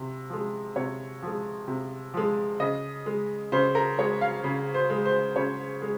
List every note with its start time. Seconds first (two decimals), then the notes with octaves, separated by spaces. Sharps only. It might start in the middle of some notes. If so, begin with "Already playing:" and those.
Already playing: C3
0.30 F3 G#3
0.76 C3 C#5
1.22 F3 G#3
1.68 C3
2.14 F3 G#3
2.60 C#3 D#5
3.06 G#3
3.52 C#3 C5
3.75 A#4
3.98 G#3 C#5
4.21 F5
4.44 C#3
4.74 C5
4.90 G#3
5.05 C5
5.36 C#3 C#5
5.82 G#3